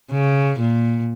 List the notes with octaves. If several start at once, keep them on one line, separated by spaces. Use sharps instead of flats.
C#3
A#2